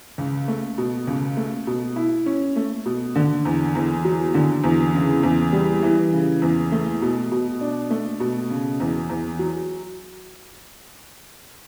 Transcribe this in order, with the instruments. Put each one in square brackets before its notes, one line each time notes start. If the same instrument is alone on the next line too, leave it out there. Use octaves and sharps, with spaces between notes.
[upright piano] C#2
A3
B2
C#2
A3
B2
E4
C#4
A3
B2
D3
E2
E2
F#3
D3
E2
C#3
E2
G3
E3
C#3
E2
A3
B2
B2
D4
A3
B2
C#3
E2
E2
F#3